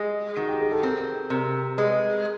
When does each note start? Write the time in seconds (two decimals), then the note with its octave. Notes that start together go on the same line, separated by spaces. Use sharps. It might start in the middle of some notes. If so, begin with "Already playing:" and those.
Already playing: G#3 G#4
0.37 D#3 F#4
0.48 G4
0.60 G#4
0.72 A4
0.83 C4 A#4
1.30 C3 A#4
1.78 G#3 B4